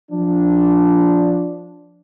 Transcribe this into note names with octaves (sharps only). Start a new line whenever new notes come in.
F3 D4